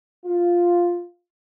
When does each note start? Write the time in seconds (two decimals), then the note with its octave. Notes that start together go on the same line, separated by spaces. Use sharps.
0.25 F4